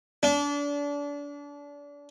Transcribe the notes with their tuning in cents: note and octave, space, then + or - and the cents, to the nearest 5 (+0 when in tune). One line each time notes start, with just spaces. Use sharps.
D4 -30